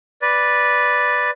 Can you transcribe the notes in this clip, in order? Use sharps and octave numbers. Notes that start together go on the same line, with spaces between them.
B4 D5